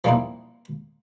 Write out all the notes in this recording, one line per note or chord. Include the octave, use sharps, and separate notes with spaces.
F3 G3 A#3 C4 D#4 E4